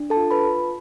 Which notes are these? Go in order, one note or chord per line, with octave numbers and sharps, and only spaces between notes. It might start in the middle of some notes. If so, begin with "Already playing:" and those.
Already playing: D4
A4 A5
F4
B4 B5